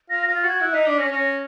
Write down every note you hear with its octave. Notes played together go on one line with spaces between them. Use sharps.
F4 A#6
A#6
F4
A6
F#4
G#6
E4 F#6
D#4 B6
D4 B6
C#4 A#6
C#4 A#6